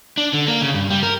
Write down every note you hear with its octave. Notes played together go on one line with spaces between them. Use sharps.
D4
D3
A#3
C#3
G2
G3
A#4